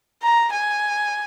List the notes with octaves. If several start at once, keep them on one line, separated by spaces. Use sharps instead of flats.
A#5
G#5